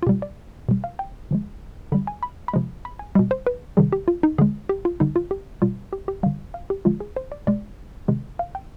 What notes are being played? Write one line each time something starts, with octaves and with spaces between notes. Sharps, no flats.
F4
B2 G3 G4
D5
B2 G3
F5
G5
D3 F3 G#3
D3 G3 B5
G#5
B5
B5
C3 F3 G#3
B5
G#5
B2 G3 D#5
C5
B4
C3 D#3 G3 G#4
G4
F4
D#4
D3 G#3 G#4
G4
F4
D3 G3 D#4
F4
G4
B2 G3 F4
G4
G4
D3 G3 F5
F5
G4
D3 F3 G#3 F4
G#4
C5
D5
B2 G#3 D5
C3 D#3 G#3
F5
G5